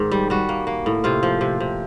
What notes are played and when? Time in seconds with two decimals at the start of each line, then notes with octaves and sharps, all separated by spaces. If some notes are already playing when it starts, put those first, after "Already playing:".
Already playing: G#2 D#3
0.12 G3
0.30 G3 F#4
0.49 A#3
0.67 A#3
0.86 A2
1.04 C3 F4
1.23 F3
1.41 C3
1.60 C3